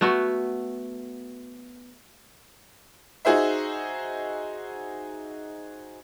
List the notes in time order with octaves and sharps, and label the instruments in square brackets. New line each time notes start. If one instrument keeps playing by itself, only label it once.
[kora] A3 B3 F#4
[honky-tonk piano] D#4 F#4 G#4 C5 E5